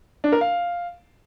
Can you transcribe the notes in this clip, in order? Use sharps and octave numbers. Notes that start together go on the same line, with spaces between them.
D4
A#4
F5